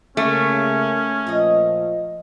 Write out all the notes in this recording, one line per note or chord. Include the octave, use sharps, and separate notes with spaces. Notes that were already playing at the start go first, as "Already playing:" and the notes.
C#3 A3 A#3 C#4
A#2 F3 D#4 D#5